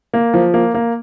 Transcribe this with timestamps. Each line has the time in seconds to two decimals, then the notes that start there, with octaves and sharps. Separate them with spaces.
0.14 A#3
0.34 F3
0.54 A#3
0.74 A#3